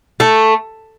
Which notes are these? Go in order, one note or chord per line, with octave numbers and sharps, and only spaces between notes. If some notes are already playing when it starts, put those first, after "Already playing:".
A3